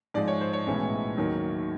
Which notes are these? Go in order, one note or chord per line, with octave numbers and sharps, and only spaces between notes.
G#2 F3 G#3 D5
C#5
C5
C#5
B1 A2 E3 G#3 C#4
D#2 D#3 F#3